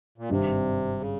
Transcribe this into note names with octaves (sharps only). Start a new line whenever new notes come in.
A#2
G#1 G2 C3 G3
C#3